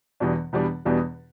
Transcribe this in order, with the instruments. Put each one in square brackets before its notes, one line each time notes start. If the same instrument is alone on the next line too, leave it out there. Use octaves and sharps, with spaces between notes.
[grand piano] E2 B2 G3 B3 D4
E2 B2 G3 B3 D4
E2 B2 G3 B3 D4